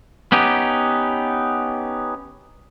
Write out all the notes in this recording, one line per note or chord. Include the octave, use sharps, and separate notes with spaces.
B3 C#4 D#4 G4